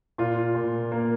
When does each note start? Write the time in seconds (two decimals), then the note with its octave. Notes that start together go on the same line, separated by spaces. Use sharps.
0.18 A#2 F4
0.55 A#2
0.92 A#3